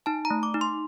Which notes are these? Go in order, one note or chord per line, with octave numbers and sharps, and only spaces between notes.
D#4 A5
A#5
A3
D6
D#4
C6